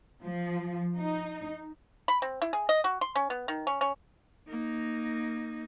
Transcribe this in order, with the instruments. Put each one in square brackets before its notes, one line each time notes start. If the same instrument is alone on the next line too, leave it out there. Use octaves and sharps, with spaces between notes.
[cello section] F3
D#4
[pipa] B5
C4
E4
G#4
D#5
F#4
C6
C#4
B3
D#3
C#4
C#4
[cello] A#3 D#4